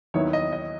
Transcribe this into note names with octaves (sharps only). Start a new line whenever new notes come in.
D#2 D#3 F#3 B3 E4 C#5
D#5
D#5